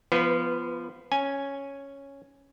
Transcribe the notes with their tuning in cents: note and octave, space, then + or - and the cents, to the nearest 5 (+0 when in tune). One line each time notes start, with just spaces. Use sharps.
F3 -20 B3 +0 B4 +20
C#4 +0 G#5 +0